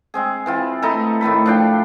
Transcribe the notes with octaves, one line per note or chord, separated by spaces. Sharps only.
G#3 C4 G#4
E3 C4 F4
A3 D#4 E4 A4
A2 D#3 A3 B5
F3 D4 G5